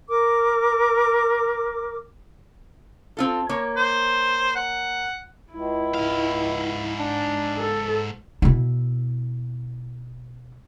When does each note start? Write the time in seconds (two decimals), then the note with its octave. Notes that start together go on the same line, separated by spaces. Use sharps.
0.08 A#4 D6
3.17 C4 F4 A4
3.49 A#3 C#5
3.77 C5
4.56 F#5
5.53 C#2 E4
5.94 G#2 F5
6.99 D4
7.56 A4
8.42 B2 E4